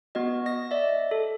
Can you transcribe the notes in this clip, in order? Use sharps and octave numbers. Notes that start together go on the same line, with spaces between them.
B3 F#4 D#5
D#5 A#6
D5 E5
A4